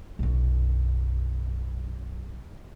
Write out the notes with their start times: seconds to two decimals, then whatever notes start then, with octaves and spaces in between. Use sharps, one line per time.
0.19 B1 F#2